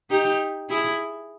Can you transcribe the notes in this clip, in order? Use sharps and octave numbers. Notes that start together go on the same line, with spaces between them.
D#4 G4
E4 G#4